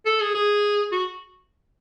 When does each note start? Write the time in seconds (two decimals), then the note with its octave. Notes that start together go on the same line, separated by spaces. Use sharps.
0.06 A4
0.20 G#4
0.35 G#4
0.92 F#4